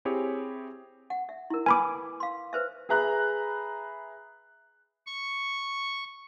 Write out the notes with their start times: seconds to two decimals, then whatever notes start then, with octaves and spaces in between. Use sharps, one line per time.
0.05 C4 E4 G4 G#4 C#5
1.10 F#5
1.29 E5
1.50 E4 A#4
1.66 B4 G#5 B5 D6
2.20 F5 C6
2.53 B4 C5 E5
2.89 G#4 B4 E5 A#5 B5 F#6
5.07 C#6